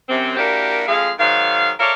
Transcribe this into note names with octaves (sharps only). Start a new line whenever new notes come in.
F#2 C3 C4
A#3 D4 E4 F#4 G4 A#4
F2 G#3 G#4 F5
G#2 D#3 F#3 F5
A4 A#4 C#5 D5 E5 F5